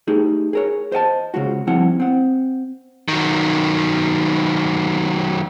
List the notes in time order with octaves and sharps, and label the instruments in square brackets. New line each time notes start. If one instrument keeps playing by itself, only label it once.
[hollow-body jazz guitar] A3 D#4 G4 G#4
G#4 A#4 C#5
C5 D#5 F#5 A5
C#3 G#3 F4 F#4
G2 F3 C4 E4 F#5
C4 F#5
[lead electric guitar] D#3 F#3